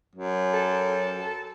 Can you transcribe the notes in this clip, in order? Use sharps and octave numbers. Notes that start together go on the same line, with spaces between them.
F#2
A4